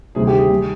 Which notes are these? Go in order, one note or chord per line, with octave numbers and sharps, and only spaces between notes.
D2 C3 D#3 G3 G#4
G4
G#4
D#3 G3